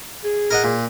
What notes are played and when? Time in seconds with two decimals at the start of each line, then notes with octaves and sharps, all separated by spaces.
0.24 G#4
0.51 A#4 D#5 F#5
0.64 A#2